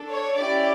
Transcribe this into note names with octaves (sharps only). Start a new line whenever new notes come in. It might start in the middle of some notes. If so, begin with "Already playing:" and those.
Already playing: D4 A4
C#5
C#4 E4 G4 D5